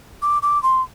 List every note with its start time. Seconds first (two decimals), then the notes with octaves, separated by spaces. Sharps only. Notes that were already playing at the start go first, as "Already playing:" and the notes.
0.22 D6
0.42 D6
0.63 C6